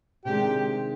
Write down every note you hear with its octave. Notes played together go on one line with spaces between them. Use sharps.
C3 D#3 G#3 D4 G4